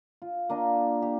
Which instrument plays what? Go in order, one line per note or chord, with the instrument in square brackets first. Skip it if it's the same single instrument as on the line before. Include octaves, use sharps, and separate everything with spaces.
[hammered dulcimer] F4
A#3 D4 D#5
G4